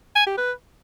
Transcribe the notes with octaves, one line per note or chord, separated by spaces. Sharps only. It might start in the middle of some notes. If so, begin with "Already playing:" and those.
G#5
G4
B4